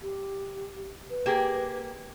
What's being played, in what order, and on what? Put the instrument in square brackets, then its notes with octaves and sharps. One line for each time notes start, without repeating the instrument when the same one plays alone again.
[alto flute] G4
B4
[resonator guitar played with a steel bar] A#3 G4 G#4